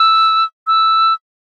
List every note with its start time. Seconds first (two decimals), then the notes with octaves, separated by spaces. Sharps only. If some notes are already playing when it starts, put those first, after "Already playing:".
Already playing: E6
0.67 E6